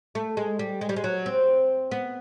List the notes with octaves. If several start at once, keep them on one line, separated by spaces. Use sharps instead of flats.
A3
G#3
G3
G#3
G3
G#3
F#3
C4
B3